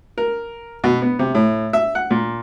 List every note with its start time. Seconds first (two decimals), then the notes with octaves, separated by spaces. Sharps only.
0.18 A#4
0.84 B2
1.02 B3
1.19 C3
1.35 A2
1.73 E5
1.95 F#5
2.11 A#2